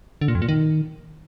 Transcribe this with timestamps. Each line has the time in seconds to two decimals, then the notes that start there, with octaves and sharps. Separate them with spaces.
0.21 D3
0.28 A#2
0.35 F2
0.42 A#2
0.49 D#3